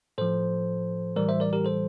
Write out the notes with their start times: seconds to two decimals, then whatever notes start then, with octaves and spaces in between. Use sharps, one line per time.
0.18 A2 F3 A4 C5
1.16 A2 E3 G3 A#4 D5
1.29 C5 E5
1.40 A#4 D5
1.53 G4 A#4
1.65 A4 C5